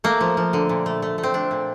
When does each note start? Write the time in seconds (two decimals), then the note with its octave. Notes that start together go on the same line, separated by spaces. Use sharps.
0.04 A3 A#3
0.21 F3
0.37 F3
0.53 D3
0.69 A#2
0.86 A3
1.02 A3
1.18 A3
1.23 C4
1.34 A3 D4
1.51 A#2